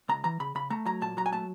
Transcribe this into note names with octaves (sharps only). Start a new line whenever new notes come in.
C#2 A#5
E3 A#5
C#3 B5
C#3 B5
A3 A#5
F#3 A#5
A#2 A5
F#3 A#5
G#5
A3 A5